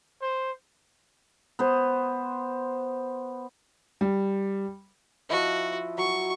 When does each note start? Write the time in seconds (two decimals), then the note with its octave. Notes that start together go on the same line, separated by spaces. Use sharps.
0.22 C5
1.59 B3 C5
4.01 G3
5.30 F3 E4 F#4 D#5
5.98 F#3 C#6